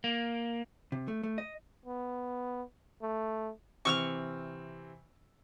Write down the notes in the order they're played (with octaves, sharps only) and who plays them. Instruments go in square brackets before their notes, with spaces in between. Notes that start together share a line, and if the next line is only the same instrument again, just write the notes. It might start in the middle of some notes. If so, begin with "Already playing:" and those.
[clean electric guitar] A#3
[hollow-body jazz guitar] C3
A3
A3
D#5
[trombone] B3
A3
[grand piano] C3 E3 C4 [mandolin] C#6 E6 F6